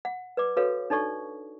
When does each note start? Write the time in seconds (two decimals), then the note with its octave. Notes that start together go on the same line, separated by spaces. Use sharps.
0.05 F#5
0.37 B4 D5 D6
0.56 F#4 A4 B4 C#5 F5
0.90 D4 D#4 A4 D5 C#6